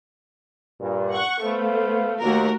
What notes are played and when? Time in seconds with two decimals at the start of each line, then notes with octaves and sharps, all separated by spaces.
0.80 G2 A#2
1.13 F#5 C#6
1.43 A3 B3 C5 F5
2.22 D#2 A3 F#4 A#4